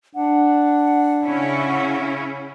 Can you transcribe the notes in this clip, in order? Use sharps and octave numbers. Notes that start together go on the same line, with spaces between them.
D4 F#5
C#3 C#4 E4